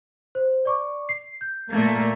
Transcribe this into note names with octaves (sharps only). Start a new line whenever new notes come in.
C5
D5 C#6 D6
C7
G6
A#2 A3 A#3